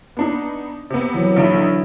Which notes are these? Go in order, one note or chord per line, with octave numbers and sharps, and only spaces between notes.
B3 D4 D#4
C3 B3
E3 F#3
A#1 D3 D#4 E4 D7